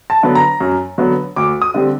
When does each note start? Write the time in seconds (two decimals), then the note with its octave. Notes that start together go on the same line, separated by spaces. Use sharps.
0.10 A5
0.23 D3 F#3 B3
0.35 A#5
0.60 F#2
0.98 D3 F#3 B3
1.36 D2 D6
1.62 D#6
1.74 D3 G3 C4